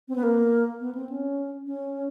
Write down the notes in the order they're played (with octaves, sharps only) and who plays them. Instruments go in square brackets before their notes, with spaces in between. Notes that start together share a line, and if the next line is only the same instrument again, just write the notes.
[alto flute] C4
B3
A#3
B3
C4
C#4
C#4